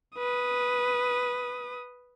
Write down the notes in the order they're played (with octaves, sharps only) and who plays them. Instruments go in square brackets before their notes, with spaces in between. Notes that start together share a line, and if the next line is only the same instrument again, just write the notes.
[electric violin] B4 D#6